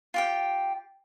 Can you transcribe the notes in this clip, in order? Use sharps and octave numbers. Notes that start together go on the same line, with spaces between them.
F4 G4 G5